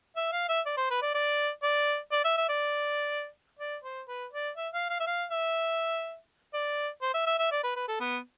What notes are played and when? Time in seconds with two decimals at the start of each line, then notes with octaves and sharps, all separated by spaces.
0.16 E5
0.33 F5
0.49 E5
0.66 D5
0.77 C5
0.90 B4
1.02 D5
1.14 D5
1.63 D5
2.12 D5
2.24 E5
2.37 E5
2.49 D5
3.59 D5
3.84 C5
4.08 B4
4.33 D5
4.57 E5
4.74 F5
4.90 F5
5.00 E5
5.07 F5
5.30 E5
6.54 D5
7.02 C5
7.14 E5
7.26 E5
7.38 E5
7.52 D5
7.64 B4
7.76 B4
7.88 A4
8.00 B3